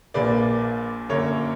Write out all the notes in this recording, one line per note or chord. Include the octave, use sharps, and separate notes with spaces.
A#1 A#2 A#3 B4 D5
F#2 D3 A#3 A#4 C#5